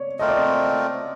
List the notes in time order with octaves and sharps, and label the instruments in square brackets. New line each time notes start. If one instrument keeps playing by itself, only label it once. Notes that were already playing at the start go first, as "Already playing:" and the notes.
Already playing: [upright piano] C#5 D5
[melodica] A3 C4 F4 A#4 [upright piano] D#5
[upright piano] D5
D#5